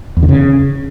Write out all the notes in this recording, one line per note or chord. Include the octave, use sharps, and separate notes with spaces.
E2
D3
C#3